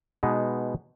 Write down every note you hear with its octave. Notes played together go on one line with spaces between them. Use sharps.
B2 G#3 B3 D#4